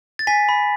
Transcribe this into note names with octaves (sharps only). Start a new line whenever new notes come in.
A6
G#5 B6
B5